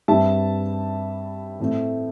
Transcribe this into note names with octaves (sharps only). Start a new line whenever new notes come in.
G2 G3 C4 E5 A5
A2 A3 C4 E4